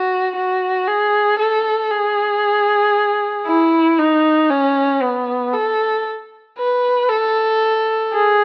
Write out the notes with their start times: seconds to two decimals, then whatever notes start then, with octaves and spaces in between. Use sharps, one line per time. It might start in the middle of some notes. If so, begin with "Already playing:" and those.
Already playing: F#4
0.36 F#4
0.87 G#4
1.39 A4
1.91 G#4
3.47 E4
3.99 D#4
4.51 C#4
5.02 B3
5.53 A4
6.58 B4
7.09 A4
8.13 G#4